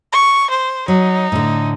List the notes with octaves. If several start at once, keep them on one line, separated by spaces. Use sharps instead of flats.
C#6
C5
F#3 D#4
A2 D3